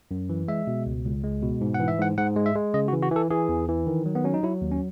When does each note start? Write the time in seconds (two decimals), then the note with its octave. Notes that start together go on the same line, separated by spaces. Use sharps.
0.11 F#2
0.29 E3
0.48 G#3 E5
0.67 B2
0.86 C#2
1.05 C#2
1.24 G#3
1.43 B2
1.61 G#2
1.74 F#5
1.80 E3
1.88 E5
1.98 G#2 F#5
2.18 G#2 F#5
2.36 G#3
2.46 E5
2.55 G#3
2.74 C#3 D#5
2.88 F#4
2.93 E3
3.03 F#4
3.11 E3 A4
3.30 E3 G#4
3.49 E2
3.68 E3
3.87 D#3
4.06 F#3
4.15 B3
4.24 F#3 C#4
4.34 D#4
4.43 F#3 E4
4.62 D#2
4.71 C#4